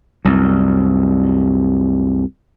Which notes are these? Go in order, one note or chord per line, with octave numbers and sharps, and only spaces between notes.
C2 F#2